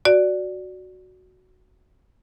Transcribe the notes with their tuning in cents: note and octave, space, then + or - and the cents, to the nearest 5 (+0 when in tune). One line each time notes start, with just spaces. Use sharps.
F#4 +0 D5 +0